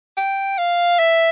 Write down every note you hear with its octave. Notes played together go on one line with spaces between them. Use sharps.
G5
F5
E5